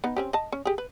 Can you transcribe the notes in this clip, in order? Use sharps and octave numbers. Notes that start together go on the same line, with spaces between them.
B3 D#4
C4 C#4 G4
D#5 A5
C#4
G4 G#4
B4